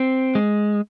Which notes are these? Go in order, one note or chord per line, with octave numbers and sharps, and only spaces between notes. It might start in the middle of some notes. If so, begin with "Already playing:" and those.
Already playing: C4
G#3